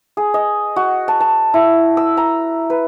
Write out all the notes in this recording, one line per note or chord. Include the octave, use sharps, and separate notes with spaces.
G#4
D#5
F#4
A5
A5
E4
E6
A#5
B4